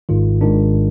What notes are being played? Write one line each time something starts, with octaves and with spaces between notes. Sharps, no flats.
G#1 G#2 D#3 F4
G#1 G#2 D#3 D4